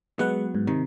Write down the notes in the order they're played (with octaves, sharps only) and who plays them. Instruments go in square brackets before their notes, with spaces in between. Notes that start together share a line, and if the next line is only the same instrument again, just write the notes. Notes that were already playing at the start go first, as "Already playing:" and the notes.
[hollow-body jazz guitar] F#3 B3 [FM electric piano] G#3 B4 F#5
[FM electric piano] G#2
[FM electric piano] C3 [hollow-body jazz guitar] D#3